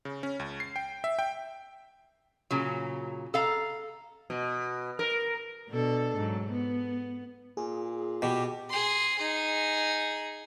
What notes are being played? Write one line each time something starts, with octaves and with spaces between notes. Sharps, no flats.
C#3
C#4
C#2
C7
G5
E5
G5
A#2 C#3 F#3
A4 F5 A#5
B2
A#4
B2 D4 A4
G#2 F#3
B3
A#2 G#4
B2 G4
G#4 C6
D#4 G#4